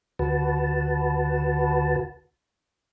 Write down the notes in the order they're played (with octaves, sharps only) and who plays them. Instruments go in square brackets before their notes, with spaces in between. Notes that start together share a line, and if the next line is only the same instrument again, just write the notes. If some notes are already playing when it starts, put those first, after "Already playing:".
[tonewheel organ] D2 F#4 B4 A5